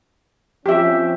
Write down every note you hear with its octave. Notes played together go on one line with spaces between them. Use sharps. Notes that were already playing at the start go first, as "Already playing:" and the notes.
F3 C4 C#4 G4 E5